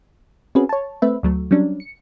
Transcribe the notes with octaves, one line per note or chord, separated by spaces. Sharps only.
C4 C#4 F#4 G#4 B4
C#5 A5
A3 C4 B4 E5
D2 F#3 A3
F#3 G3 C#4 D4
C#7